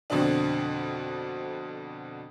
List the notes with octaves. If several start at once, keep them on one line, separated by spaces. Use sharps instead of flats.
F2 B2 D3 C4 D4